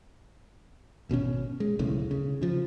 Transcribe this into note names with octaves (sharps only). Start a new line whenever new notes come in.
G#1 B2 F3 C#4
G#3
D1 B1 A2 C#3
C#3
C#3 F3